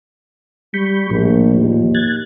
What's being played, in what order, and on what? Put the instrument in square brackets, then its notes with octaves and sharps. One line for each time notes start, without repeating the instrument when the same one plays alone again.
[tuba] G3 [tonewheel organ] B5 C#6 G6
[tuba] A#1 [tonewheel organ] A2 F3
[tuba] D#2
[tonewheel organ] F#6 G#6 A6